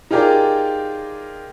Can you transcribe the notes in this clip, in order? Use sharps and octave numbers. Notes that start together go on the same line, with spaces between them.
D#4 F4 G4 G#4 A#4 D5